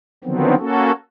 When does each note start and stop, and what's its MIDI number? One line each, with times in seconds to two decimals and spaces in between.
0.24 0.55 50
0.24 0.55 51
0.24 0.55 53
0.24 0.55 54
0.24 0.55 59
0.24 0.55 60
0.59 0.91 58
0.59 0.91 61
0.59 0.91 66
0.59 0.91 69